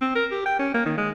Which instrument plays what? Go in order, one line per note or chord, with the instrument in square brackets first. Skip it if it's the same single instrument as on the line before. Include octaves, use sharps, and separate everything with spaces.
[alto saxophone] C4
A#4
G4
G5
C#4
A#3
D#3
G#3